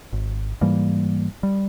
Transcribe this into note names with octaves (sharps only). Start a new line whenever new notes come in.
G#1
G#2 E3 G3 A#3
G3